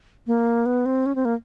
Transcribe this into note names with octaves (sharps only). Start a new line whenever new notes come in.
A#3
B3
C4
C#4
C4
A#3